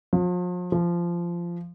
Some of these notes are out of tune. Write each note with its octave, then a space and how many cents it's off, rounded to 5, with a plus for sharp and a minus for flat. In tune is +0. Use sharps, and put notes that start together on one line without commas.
F3 +40
F3 -15